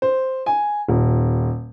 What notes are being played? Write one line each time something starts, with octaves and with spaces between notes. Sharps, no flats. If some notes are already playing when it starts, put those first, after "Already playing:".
C5
G#5
D#1